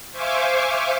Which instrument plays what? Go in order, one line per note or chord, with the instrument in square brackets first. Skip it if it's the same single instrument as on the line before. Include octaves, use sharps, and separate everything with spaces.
[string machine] C5 E5 F5 G#5 C#6 D6